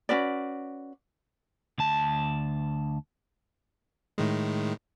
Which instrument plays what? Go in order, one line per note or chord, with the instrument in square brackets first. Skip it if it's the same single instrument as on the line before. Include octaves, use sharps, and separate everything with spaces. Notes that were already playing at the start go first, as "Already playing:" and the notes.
[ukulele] C#4 F#4 B4 D5
[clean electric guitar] D2 A5
[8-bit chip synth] A2 D#3 G#3